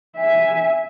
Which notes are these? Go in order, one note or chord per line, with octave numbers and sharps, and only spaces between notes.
E5 G#5